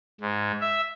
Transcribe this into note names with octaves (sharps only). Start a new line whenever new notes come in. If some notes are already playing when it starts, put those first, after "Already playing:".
G#2
E5